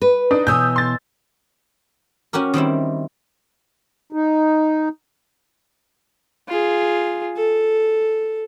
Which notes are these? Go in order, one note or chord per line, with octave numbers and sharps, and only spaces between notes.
B4
D4 D#4
B2 E3 C#5 D#6 E6 G6
C6 A6
C#4 F#4 G4 A#4
D#3 G3 C4 E4
D#4
F4 G#4
A4